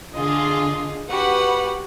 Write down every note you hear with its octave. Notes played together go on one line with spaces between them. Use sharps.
D3 F4 G#4 D#5
F#4 G4 B4 F#5